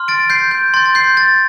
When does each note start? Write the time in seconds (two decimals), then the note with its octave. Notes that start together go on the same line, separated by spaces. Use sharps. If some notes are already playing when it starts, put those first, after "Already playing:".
Already playing: C6 F6
0.08 A6 D7
0.30 G6 C7
0.51 G6
0.74 C6 A6
0.76 G6
0.86 A6
0.95 G6 C7
1.17 A6